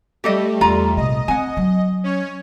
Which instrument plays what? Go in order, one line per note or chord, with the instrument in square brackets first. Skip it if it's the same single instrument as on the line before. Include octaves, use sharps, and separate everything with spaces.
[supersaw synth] G3 A3 [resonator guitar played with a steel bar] G4 A4 D#5
[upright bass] E2 [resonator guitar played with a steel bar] F4 A#5
[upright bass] A#1 C3 [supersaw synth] D#5
[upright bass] C4 [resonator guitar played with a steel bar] F#5 G#5
[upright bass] F#3
[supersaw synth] C#4 C#5